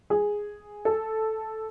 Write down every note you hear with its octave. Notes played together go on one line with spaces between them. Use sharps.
G#4
A4